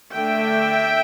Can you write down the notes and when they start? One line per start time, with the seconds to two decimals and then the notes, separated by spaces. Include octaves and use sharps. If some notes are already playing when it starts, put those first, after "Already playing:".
0.12 D3 A3 D4 E5 G5